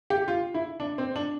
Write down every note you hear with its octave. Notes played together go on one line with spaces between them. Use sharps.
G4
F4
E4
D4
C4
D4